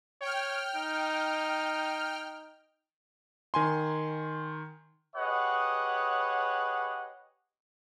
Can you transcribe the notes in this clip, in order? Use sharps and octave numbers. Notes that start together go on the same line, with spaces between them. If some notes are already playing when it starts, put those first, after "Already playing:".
C#5 G5 F6
D#4
D#3 G#5 C6
G4 G#4 B4 C#5 D#5 F#5